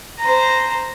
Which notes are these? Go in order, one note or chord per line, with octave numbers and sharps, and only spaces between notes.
C5 A#5